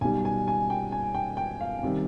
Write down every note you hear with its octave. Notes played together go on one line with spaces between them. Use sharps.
B1 B2 G3 G#5
G#5
G#5
G5
G#5
G5
G5
F5
C3 D#3 G3